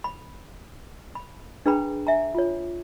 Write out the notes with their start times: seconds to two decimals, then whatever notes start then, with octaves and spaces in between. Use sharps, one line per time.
0.04 B5
1.15 B5
1.66 D4 G#4 B4 G5 A#5 B5
2.07 E5 G#5 A#5
2.35 F4 C#5